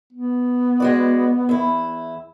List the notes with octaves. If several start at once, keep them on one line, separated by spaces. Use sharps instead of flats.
B3
G#3 F#4 D5
E2 E4